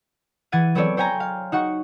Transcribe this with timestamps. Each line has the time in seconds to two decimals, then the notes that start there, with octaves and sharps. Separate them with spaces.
0.52 E3 F#5 G#6 A6 D#7
0.75 F#3 B3 C4 A4 C#5 D5
0.97 C5 C#5 G5 G#5 A#5
1.20 F5
1.52 D#4 F#4 F#5 C#6